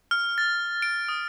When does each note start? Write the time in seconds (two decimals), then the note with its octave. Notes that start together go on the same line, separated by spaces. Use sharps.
0.11 F6
0.38 A6
0.82 D7
1.08 D#6